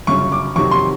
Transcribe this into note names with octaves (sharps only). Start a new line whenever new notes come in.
G1 F#2 C#3 C#6
D6
F2 C3 D#3 F#3 C#6
C6